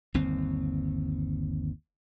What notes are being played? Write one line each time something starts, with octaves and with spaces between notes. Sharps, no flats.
G1 D#2 C4